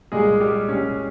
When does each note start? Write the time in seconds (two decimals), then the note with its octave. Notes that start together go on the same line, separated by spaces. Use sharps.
0.12 C2 A#2 G3 G#3 G#4
0.41 G3 G4
0.68 C2 A#2 G3 C#4